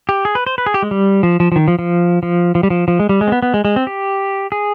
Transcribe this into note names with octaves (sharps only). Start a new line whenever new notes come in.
G4
G#4
B4
C5
B4
G#4
G4
G#3
G3
F3
F3
F3
D#3
F3
F3
F3
F3
G3
F3
F3
G#3
G3
G#3
C4
B3
B3
G#3
G#3
C4
G4
G#4